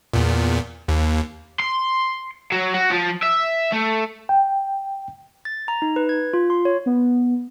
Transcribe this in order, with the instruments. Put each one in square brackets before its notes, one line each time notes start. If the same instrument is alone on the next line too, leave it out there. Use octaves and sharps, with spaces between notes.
[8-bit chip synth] E2 A#2
D#2
[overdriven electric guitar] C6
F#3
F#4
F3
E5
A3
[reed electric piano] G5
[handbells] A6
A#5
D#4
B4
G#6
F4
C6
C#5
[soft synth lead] B3